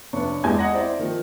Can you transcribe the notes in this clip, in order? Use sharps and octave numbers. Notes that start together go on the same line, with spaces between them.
F1 B3 C#4 D4 C#6
E2 G#3 G#5 G6 G#6
D#5 F#5 A#5 A#6
C4 E4 C5 D5
D#3 F3